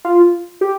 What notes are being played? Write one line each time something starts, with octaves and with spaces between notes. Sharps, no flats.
F4
G4